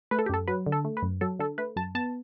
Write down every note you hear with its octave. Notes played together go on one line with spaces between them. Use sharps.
A3 B4
A4
G4
F#2 A4
F#3 B4
D3
A4
A3
B4
F#2
F#3 A4
D3 A4
A3 B4
F#2 A5
B3 A5